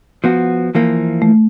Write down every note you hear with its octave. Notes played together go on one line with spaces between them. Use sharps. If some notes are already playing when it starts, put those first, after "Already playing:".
F3 B3 F#4
E3 F3 A#3
A3